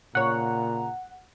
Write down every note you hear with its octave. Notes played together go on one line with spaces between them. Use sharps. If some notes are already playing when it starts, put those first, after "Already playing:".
A#2 C#3 C#5 F#5 A#5